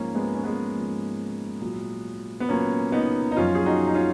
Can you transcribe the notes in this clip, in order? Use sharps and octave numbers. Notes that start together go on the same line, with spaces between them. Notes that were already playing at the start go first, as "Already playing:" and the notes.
Already playing: G#2 F3 A#3 C#4
G#3 B3
C#4
G#3 B3
G#2 F3
A#2 F#3
B3
A#2 F#3 A#3 C#4
B3 D#4
D#4
F#2 F3 C#4 F4
G#4
D#4 F#4
D#4
C#4 F4